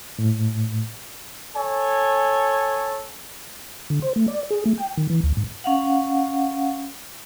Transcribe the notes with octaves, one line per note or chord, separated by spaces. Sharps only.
A2
A4 C#5 G#5
D3
C5
A3
D5
G#4
A3
G5
D#3
E3
D2
G#2
C#4 F5 F#5